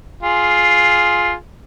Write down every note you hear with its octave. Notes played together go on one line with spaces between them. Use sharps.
F4 G#4